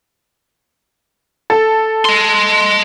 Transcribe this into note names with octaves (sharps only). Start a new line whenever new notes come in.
A4
D#5 C6